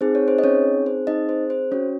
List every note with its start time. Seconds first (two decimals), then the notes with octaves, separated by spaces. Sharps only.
0.01 C4 D#4 G#4 C5
0.15 C#5
0.28 C5
0.38 D#5
0.44 C#4 C#5
0.86 C5
1.07 D#4 D#5
1.29 C5
1.50 C5
1.71 C#4 F#4 C#5